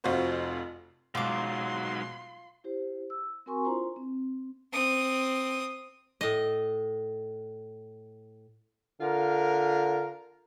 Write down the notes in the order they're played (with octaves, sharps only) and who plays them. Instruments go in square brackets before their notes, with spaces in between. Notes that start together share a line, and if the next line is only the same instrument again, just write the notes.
[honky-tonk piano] F1 F2 F4 F#4 C5 C#6
[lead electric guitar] G#2 F#3 [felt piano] B2 G#3 [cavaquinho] F4 D6 [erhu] C6
[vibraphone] E4 G4 C5
E6
C4 F#4 A#4 G#5 C6 C#6
D4 E4 F4 C5 A#5 C6
C4
[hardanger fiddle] C4 D#6
[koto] A2 D#5
[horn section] D3 F4 A#4